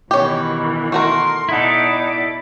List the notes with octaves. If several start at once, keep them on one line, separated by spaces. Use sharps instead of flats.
B2 D#3 E3 C#4 G4
A3 F#4 A#4 A#5 C6
B2 D#4 E4 A4 D5 F#5 D6